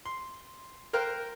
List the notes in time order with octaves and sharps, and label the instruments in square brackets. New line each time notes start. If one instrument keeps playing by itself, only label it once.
[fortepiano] C6
A#4 C5 F5 G5 F#6